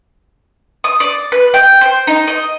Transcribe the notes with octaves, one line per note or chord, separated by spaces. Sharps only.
D#6
D5
B4
G5
C5
D#4
D#5